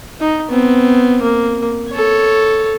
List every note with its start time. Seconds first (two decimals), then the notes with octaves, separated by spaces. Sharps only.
0.20 D#4
0.50 B3 C4
1.22 A#3
1.91 A4 C#5